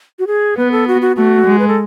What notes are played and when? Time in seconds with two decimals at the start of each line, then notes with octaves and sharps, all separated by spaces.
0.19 F#4
0.27 G#4
0.58 B3 B4
0.72 A4
0.88 F#4
1.01 F#4
1.16 A3 F#4
1.47 G#3
1.59 B4
1.68 A4